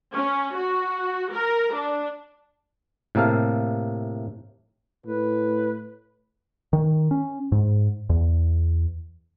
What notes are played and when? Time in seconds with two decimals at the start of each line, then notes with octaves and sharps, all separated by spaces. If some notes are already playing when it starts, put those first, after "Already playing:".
0.13 C#4
0.55 F#4
1.32 A#4
1.74 D4
3.15 A2 C3 A#3 A4 F5
5.06 A2 B4
6.73 D#3
7.11 C#4
7.52 G#2
8.10 E2